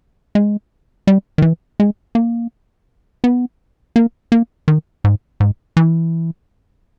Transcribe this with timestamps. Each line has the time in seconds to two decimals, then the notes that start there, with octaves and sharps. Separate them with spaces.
0.35 G#3
1.07 G3
1.38 D#3
1.42 E3
1.80 G#3
2.15 A#3
3.24 B3
3.96 A#3
4.32 A#3
4.68 D#3
5.04 G#2
5.40 G#2
5.77 E3